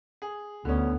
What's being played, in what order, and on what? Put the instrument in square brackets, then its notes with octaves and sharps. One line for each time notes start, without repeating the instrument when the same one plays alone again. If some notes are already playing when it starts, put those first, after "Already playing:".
[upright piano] G#4
[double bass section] D2 [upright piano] D3 C#4 [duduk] B3